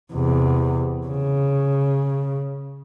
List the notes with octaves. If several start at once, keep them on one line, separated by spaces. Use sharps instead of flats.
E2 C3
C#3